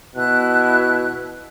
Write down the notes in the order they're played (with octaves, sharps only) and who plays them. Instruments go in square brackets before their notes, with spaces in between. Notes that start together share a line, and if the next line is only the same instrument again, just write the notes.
[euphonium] B2 [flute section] E4 F#6